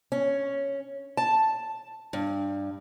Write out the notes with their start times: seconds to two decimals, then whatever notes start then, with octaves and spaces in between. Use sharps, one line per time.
0.12 C#4
1.17 A5
2.13 G2